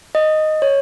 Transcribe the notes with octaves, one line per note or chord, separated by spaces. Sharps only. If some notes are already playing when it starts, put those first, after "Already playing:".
D#5
C#5